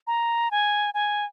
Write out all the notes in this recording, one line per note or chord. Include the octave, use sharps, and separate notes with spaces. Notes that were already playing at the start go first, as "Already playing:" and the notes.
A#5
G#5
G#5